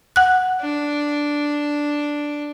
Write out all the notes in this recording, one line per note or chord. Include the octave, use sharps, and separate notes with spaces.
F#5 F#6
D4